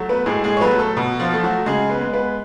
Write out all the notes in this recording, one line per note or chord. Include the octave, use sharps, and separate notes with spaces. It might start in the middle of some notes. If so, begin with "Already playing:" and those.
Already playing: F#3 A3
B3 B4
A2 G#3 G#4
G#3 G#4
C#5
F#3 A3 B3 B4
A3 A4
B2
F3 F4
F#3 A3
F#3 F#4
C#3 G#3 G#4
B3 B4
G#3
B3 B4